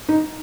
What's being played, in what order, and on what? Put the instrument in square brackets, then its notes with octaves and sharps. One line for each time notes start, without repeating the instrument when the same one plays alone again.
[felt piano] D#4